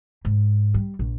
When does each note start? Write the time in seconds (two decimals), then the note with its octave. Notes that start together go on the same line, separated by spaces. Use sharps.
0.25 G#2
0.74 G3
0.99 A#1